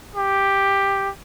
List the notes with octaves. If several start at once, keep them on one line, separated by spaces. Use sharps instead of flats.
G4